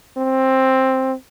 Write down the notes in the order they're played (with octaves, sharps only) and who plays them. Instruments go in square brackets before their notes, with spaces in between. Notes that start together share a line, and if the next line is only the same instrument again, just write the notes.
[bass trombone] C4